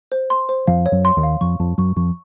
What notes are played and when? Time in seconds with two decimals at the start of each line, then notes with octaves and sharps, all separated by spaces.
0.12 C5
0.30 C6
0.49 C5
0.67 F2 F3 F5
0.86 C#5
0.92 F#2 F#3
1.05 C6
1.16 D#2 D#3
1.23 F5
1.41 F2 F3 C#6
1.60 F2 F3 A5
1.78 F#2 F#3 C#6
1.96 F2 F3 C#6